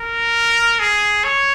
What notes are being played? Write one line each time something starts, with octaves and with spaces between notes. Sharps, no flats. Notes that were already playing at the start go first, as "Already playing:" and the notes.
Already playing: A#4
G#4
C#5